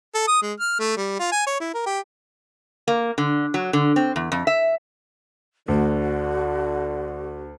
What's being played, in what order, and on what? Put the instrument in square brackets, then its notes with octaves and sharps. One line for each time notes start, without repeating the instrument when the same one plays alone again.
[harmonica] A4
D#6
G#3
F6
A3
G3
F4
G#5
C#5
E4
A#4
G4
[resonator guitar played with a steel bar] A#3
D3
F#3
D3
C4
E2
F2
E5
[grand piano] D2 [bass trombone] D3 [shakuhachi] F#4